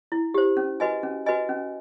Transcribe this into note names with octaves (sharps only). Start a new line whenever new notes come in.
E4
G4 C5
C#4
F#4 B4 D#5 G#5
C#4
F#4 B4 D#5 G#5
C#4